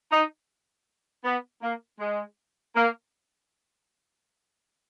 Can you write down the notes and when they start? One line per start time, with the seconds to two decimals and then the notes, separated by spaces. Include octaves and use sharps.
0.11 D#4
1.24 B3
1.62 A#3
1.99 G#3
2.76 A#3